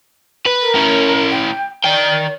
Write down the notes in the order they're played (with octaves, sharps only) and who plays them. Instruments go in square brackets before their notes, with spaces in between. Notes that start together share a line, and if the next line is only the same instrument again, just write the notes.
[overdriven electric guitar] B4
[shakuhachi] A#4
[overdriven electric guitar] C#4 E4
[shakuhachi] G5
[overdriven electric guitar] D#3 G5 [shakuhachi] D5